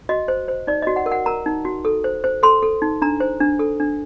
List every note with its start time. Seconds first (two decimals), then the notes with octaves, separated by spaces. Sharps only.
0.09 F#4 D#5
0.28 C5
0.48 C5
0.67 D#4 D5
0.82 F#4 D#5
0.96 F#5
1.06 A#4
1.11 F#5
1.26 A#4 A#5
1.46 D#4
1.65 F#4
1.85 A4
2.04 C5
2.24 C5
2.43 A4 C6
2.62 A4
2.82 D#4
3.02 D4 A#5
3.20 C5
3.40 D4
3.59 A4
3.80 D4